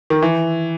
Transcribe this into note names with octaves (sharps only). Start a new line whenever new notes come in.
D#3
E3